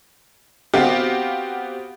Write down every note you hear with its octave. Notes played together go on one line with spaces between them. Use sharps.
B3 C4 F#4 G4 F5